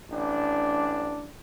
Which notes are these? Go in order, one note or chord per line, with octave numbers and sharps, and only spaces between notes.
A1 D4